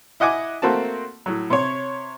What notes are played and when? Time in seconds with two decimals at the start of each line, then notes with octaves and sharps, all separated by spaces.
0.20 E4 D#5 F#5 G#5 D6
0.62 A3 A#3 C4 F#4 A5
1.26 A2 F#3
1.50 C3 C#5